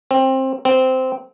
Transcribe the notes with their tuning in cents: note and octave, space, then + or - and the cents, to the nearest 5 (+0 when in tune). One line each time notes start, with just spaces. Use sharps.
C4 +20
C4 -10